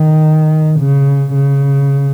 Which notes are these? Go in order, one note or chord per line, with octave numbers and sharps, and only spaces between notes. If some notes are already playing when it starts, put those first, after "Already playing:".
Already playing: D#3
C#3
C#3